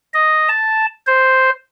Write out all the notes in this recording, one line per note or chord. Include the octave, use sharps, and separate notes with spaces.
D#5
A5
C5